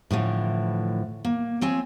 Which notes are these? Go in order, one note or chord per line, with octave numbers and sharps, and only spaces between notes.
A2 D3 E3 F3
A#3
F3 C4 C#5 G#5